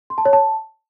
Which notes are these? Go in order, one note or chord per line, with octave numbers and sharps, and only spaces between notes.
C6
A5
C#5
A5